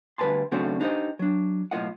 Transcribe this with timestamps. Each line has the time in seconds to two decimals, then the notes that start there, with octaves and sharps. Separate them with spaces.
0.18 D2 G3 B4 G#5 A5 C6
0.52 C#3 F#3 A3 C4 D4 F#4
0.80 D4 D#4 G4 G#4 C5 D#5
1.19 F#3 D4
1.71 B1 A2 F3 F4 D#5 F#5